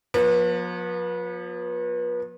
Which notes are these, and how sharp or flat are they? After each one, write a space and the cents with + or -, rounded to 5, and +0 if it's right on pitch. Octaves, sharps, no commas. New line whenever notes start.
F3 +40 B3 -30